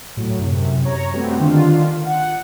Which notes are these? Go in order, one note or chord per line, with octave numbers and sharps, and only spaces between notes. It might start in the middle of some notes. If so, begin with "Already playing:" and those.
A2 F#3
F#2 C3
C#5 A#5
G3 A3 B3 C4 F#4 G4
D3 D#3 D4 F4
F#5